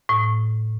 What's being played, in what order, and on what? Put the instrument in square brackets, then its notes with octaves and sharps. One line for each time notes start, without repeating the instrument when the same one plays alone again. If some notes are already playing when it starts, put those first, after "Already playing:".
[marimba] A2